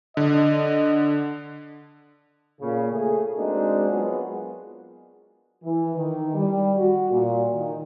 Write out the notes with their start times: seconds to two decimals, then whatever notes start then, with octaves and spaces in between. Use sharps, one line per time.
0.17 D3 D#5
2.61 A#2 C#3
2.92 A3 G#4
3.37 G#3 A#3 C4 D4 D#4 F#4
3.89 F#3 G#3 B3 F4 F#4 G#4
5.64 E3
5.96 D#3
6.35 G3
6.76 F#4
7.10 A#2
7.53 D#3